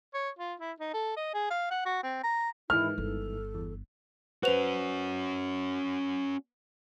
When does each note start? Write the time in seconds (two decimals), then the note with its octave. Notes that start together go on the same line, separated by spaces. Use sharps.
0.14 C#5
0.39 F4
0.60 E4
0.80 D#4
0.94 A4
1.17 D#5
1.34 G#4
1.50 F5
1.71 F#5
1.86 F#4
2.03 C4
2.24 A#5
2.70 G#2 D#3 E3 E4 F6
2.98 G1 A4
3.55 E2
4.43 C#4 F#4 B4 C5 F7